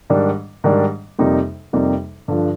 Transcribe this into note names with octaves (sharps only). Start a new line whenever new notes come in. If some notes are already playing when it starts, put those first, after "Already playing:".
G#2 D#3 G3 D4
G#2 D#3 G3 D4
F2 C3 G3 A#3 D#4
F2 C3 G3 A#3 D#4
G2 D3 F3